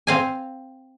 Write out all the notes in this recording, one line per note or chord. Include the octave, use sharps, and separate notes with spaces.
C4 F5 G#5